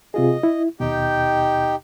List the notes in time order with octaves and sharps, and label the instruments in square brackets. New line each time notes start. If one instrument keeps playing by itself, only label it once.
[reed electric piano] C3 F4 G#4 [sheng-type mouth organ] D#5
[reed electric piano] E4
[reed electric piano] D#2 B2 [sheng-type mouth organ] D#4 G4 G5